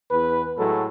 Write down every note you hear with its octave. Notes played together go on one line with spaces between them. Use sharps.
E2 B4
A2 F#3 G#3 A4